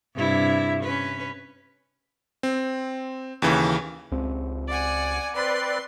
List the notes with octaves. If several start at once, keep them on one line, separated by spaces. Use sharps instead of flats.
G2 C3 E4
C#4 B4
C4
D#2 C#3 E3
C#2 C4
D5 F#5 G#5
C4 B4 D5 C6